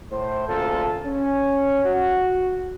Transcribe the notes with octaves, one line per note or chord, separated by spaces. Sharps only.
A2 C5
D2 A#2 C#3 F4 A4
C#4
F#4